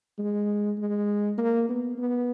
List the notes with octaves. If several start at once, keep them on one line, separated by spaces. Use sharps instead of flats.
G#3
G#3
A#3
B3
B3